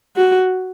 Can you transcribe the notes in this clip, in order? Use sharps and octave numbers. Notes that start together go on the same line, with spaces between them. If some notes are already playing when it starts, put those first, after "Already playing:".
F#4